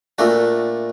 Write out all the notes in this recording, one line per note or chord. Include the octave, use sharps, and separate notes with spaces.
A#2 A3 D4 F#4